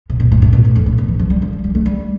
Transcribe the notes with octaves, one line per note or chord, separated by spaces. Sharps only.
C3
B2
A2
A2
B2
A2
F2
A2
B2
E3
F3
G3
F3
F3
G3
A3
G3